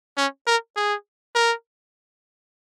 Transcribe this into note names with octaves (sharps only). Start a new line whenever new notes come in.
C#4
A#4
G#4
A#4